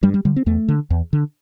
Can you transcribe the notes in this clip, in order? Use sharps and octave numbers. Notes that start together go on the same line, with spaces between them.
G2 G3
G3
D3 G3
C4
E2 A3
D3
E2
D3